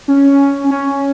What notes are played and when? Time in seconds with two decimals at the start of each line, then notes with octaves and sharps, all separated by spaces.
0.08 C#4
0.70 C#4